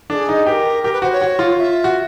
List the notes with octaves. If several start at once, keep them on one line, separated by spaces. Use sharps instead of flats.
D4 G#4 A4
D#4
G4 A#4 B4
G4 A#4
B4
F#4 C5
C#5
F#4
F4
E5
F#4